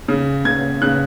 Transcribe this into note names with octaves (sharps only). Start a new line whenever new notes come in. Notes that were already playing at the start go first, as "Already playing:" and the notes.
C#3
C#3 G#6
C#3 F#6